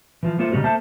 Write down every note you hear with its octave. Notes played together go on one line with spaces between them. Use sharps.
E3 F3
A3 A#3 F4 C5
C#3 E3 G3 D#4 F#4
A3 A#3 C5 E5 A5